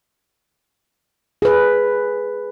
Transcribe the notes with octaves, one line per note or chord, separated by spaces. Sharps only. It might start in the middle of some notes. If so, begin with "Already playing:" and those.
G#4 B4